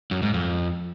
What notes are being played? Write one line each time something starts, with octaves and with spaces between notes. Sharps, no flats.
F#2
G#2
F2